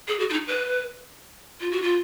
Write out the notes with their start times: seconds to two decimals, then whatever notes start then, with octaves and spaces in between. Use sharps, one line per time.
0.08 G#4
0.19 F#4
0.30 F4
0.32 D#4
0.47 B4
1.61 F4
1.71 F#4
1.82 F4